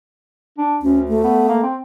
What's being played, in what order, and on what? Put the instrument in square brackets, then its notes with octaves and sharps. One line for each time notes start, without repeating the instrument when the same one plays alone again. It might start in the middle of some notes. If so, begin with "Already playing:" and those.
[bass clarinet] D4
[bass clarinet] D2 [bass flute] C#4
[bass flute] A3
[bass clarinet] B3
A#3
C4